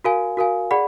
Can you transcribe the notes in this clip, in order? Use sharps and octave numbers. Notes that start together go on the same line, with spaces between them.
F#4 A#4 F5 G#5
F#4 A#4 F5 G#5
G#4 D5 F#5 B5